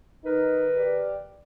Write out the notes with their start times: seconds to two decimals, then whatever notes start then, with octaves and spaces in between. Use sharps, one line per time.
0.25 D3 D#4 A#4 B4
0.76 G4 D5